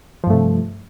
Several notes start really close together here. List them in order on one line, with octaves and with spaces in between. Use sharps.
F3 G2 A3 C3